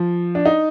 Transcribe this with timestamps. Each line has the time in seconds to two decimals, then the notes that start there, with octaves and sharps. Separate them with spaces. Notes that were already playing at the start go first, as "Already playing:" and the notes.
Already playing: F3
0.35 D4
0.46 D#4